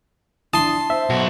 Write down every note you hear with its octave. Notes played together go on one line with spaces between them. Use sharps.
D4 E4 A5 C6 D#6
C5 E5
B1 F#4